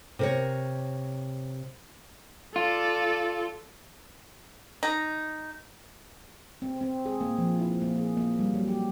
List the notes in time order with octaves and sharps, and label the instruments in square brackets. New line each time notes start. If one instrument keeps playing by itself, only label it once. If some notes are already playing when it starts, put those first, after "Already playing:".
[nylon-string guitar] C3 A#4 C#5
[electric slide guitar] F4 [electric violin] A4 D5
[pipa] D#4
[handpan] C4
C4
G#4
A#3
F3
E4
A#3
G#4
A#3
G3
F#3
G4